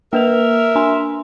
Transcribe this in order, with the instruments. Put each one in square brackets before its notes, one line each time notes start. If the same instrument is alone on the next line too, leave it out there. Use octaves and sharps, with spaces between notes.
[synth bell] A#3 B4 F7 [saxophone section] A#4 E5
[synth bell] D4 G#5 C6